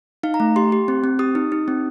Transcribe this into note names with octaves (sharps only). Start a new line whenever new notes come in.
D#4 F5
A#5
A3
G4 C6
G4
C4
C4
G4 D#6
D#4
D#4
C4